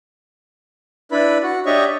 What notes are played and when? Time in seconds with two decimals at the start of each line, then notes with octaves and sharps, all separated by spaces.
1.12 D4 E4 B4 B5
1.43 F#4
1.66 D4 G4 C#5 D#5 E5 C#6